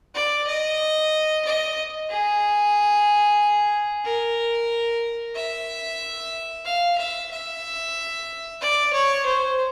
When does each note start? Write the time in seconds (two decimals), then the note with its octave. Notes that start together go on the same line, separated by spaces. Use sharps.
0.15 D5
0.47 D#5
1.45 D#5
2.10 G#4
4.05 A#4
5.35 E5
6.66 F5
6.98 E5
7.31 E5
8.61 D5
8.93 C#5
9.26 C5